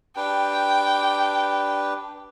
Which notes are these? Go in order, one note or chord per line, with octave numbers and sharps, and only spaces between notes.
D4 G4 B4 G5